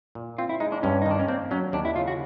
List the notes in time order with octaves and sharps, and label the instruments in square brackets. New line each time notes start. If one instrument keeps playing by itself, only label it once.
[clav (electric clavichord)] A#2
[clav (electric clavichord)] C4 [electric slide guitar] F4
[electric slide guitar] E4
[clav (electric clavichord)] G#3 [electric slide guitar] D#4
[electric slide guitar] D4
[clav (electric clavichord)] G2 [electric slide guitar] C#4
[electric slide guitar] D#4
[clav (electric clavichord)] D#3 [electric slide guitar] D4
[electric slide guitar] C#4
[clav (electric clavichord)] A#3 [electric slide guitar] C4
[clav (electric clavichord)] F#3 [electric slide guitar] C#4
[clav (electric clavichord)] D#2 [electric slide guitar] D4
[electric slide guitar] E4
[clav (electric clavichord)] C#3 [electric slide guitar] F4
[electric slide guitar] F#4